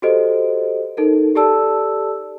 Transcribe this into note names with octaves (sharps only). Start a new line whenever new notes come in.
F#4 G4 A4 C5 D#5
D#4 A4 A#4
G4 A4 D5 A5 E6